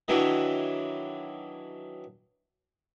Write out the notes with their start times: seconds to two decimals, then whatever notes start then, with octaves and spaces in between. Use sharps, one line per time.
0.08 D#3 E3 F#3 D4 E4